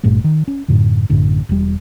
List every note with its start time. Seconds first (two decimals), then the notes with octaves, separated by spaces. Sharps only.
0.03 G1 G2 A#2 A3
0.24 D#3
0.48 C#4
0.68 F#2 A2 D3
1.10 A1 F#2 A2 D3
1.49 E1 G3